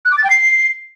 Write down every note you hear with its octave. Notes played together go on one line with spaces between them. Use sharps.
F#6
D6
A6
G5
C7